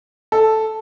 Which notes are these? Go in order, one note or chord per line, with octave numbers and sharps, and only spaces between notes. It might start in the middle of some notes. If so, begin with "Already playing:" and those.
A4